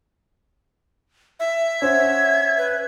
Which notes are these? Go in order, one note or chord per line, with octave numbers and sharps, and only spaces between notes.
E5
C#4 C5 F#5 G#6
B4